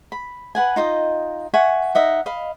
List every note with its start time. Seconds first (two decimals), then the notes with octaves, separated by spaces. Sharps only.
0.12 B5
0.55 B4 F#5 G#5
0.76 D#4 F4 D#5 G5
1.54 E5 F#5 G#5 C#6
1.95 D#4 D#5 E5 F#5
2.26 D#5 F5 B5